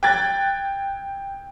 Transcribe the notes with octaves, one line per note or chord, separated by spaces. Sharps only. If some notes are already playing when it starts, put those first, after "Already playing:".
G5 F#6 G#6 A6